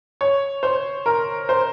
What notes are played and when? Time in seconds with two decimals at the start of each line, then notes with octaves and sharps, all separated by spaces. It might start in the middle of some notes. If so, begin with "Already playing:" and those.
0.21 C#5
0.63 C5
1.06 A#4
1.49 C5